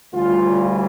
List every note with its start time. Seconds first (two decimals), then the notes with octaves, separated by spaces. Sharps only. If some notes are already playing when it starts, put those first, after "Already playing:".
0.12 D2 C#3 E3 G3 F4